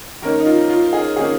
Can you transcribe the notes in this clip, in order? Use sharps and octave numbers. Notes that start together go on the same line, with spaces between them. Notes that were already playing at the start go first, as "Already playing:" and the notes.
D#3 A#3 C#4 A#4
D#4
F4
F4
G#4
D#3 A#3 C#4 G#4